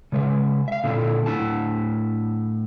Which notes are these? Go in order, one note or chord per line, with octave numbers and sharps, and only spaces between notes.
C#3 G#3 B4 E5
E5 F5
A#2 D3 A#3 D4 E4 A4
A2 D4 E4 A5